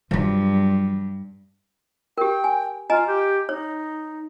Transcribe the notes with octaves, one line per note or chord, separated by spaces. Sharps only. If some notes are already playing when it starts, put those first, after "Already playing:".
G2 F3 F#3
G4 A#4 G5
G#5
F4 D#5 G#5 A#5
G4
D#4 C#5